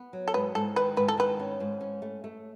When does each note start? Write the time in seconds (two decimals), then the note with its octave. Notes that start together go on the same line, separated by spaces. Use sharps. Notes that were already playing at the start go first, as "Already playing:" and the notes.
Already playing: B3
0.13 F#3
0.28 A4
0.34 G#2 B4
0.55 G#2 A4
0.76 D#3 B4
0.97 G#2 B4
1.08 A4
1.17 D#3 B4
1.40 C#4
1.60 G#2
1.81 C#4
2.02 A3
2.24 A3